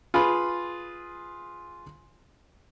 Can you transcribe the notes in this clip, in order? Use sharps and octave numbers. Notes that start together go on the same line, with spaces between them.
F4 G#4 B4 B5